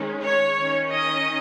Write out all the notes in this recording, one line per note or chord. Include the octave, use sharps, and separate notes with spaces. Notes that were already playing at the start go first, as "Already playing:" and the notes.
Already playing: D#3 G#3 C#4
C#5
D#3 C#4
D#5